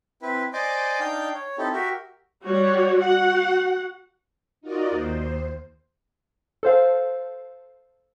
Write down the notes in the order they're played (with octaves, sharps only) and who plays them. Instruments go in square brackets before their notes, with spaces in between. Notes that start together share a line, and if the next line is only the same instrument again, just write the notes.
[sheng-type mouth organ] C4 E4 B4
C5 D5 D#5 G#5 C6 D6
D4 D#4 F5 G5 G6
C#5
C4 D#4 E4 G4 A4
F#4 G4 A#4 E5
[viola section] G3 F#4 C#5
F#4 F#5
[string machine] D#4 F4 F#4 A#4 D5 D#5
D#2 C5
[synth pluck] A4 C5 F5